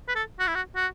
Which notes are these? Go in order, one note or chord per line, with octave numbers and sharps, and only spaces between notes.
B4
A4
F#4
E4
F#4
F#4